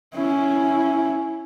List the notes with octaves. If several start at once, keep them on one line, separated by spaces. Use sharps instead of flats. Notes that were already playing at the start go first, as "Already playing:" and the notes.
C#4 E4